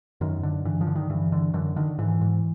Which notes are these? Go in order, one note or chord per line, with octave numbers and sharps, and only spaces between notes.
F#2 D#3
D3
G2 E3
F3
D3
D#3
G2 E3
D3
F#2 D3
D3 D#3
G#2 E3
G#2